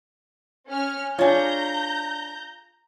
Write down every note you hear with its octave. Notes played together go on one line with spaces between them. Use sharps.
C#4 F6
D4 F4 G#4 C#5 A#5 G6